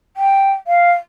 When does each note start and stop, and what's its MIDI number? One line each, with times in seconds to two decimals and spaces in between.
0.17 0.52 79
0.67 0.92 77